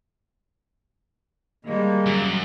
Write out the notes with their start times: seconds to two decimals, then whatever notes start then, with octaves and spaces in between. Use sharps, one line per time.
1.65 D#3 G3 G#3 A#3
2.06 F#2